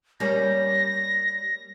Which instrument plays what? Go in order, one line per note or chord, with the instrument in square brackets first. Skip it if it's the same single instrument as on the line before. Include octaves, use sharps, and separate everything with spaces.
[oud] G3 A#3 C#4 [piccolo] A#6